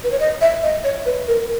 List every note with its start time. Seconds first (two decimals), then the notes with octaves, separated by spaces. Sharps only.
0.04 B4
0.12 C#5
0.20 D#5
0.41 E5
0.63 D#5
0.84 C#5
1.06 B4
1.28 A#4